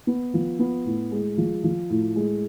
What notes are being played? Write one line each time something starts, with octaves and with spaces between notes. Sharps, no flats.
B3
F3
B3
A2
G#3
F3
F3
A2
G#3